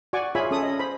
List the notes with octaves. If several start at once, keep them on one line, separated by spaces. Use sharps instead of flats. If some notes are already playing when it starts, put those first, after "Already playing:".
F#4 D5 F#5 G#5 C#6 D6
F4 G#4 C#5 E5 G#5 B5
C#4 A4 D#6
D#5
C5 B5